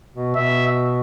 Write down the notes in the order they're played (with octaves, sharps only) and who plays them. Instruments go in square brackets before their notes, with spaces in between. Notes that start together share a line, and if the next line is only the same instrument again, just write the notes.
[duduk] B2
[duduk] B2 [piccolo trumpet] E5